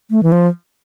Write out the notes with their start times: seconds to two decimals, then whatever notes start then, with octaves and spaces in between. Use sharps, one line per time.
0.11 A3
0.23 E3
0.32 F3